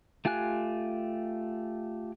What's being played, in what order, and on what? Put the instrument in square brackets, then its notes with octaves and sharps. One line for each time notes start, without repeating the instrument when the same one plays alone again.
[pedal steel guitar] A3 F4 G4 G#5 F#6